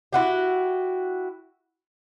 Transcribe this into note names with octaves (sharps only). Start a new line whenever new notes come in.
E4 F#4 G4